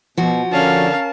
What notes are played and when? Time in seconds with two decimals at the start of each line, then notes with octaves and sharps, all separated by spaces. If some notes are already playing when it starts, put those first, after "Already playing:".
0.17 B2 F3 F#4
0.52 D3 C#4 D4 A#4 F5 A5